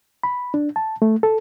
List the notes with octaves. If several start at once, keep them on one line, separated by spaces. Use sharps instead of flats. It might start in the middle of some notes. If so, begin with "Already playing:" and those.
B5
D4
A5
A3
A4